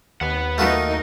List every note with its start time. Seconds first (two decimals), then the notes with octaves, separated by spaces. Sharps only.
0.21 D#2 B4 F#5
0.58 A3 D#4 F4 F#4 A#4 D#5